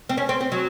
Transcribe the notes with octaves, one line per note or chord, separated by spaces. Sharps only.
C4
C#4
C4
C4
F#3